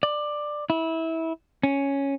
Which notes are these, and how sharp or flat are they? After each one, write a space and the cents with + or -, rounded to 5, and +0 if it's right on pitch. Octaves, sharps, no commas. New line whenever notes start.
D5 +15
E4 -20
C#4 +0